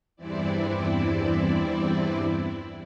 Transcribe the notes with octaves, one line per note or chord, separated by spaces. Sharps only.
E2 G2 E3 C4 E4 D5